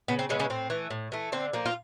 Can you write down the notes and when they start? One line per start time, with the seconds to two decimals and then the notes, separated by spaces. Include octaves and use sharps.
0.08 C#3 B3
0.19 C4
0.29 C#3 E3 G#3 B3 C#4
0.39 C#3 C#4
0.50 A2 C4
0.70 E3 A3
0.91 A2
1.12 E3 A3
1.32 D3 C4
1.53 F3 A#3
1.66 F4